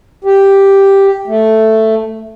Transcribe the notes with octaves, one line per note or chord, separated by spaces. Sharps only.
G4
A3